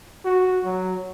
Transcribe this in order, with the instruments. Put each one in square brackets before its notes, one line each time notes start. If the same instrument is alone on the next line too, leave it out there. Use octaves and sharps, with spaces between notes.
[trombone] F#4
F#3